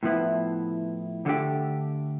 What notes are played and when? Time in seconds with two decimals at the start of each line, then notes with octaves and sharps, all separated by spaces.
0.03 A2 F3 B3 E4
1.25 D2 D3 A3 D4 G4